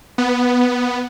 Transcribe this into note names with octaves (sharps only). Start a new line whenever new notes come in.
B3